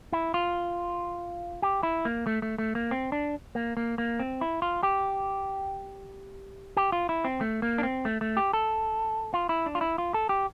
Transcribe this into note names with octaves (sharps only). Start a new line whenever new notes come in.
E4
F4
G4
E4
A#3
A3
A3
A3
A#3
C4
D4
A#3
A#3
A#3
C4
E4
F4
G4
G4
F4
E4
C4
A3
A#3
D4
C4
A3
A3
G4
A4
F4
E4
D4
F4
E4
F4
A4
G4